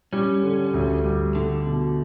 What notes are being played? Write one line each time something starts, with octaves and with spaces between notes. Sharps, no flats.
G3 C#4
D3
D2
G3
D3 A3
B2